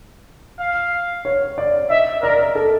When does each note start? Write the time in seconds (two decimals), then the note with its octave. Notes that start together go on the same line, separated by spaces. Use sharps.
0.60 F5
1.25 C#5
1.58 D5
1.90 D#5 E5
2.22 A#4 D5
2.55 A4